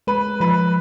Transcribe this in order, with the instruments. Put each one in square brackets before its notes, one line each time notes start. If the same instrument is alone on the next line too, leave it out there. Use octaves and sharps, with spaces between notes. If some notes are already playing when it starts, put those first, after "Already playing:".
[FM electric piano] G#3 [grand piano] B4
[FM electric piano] F3 [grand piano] B4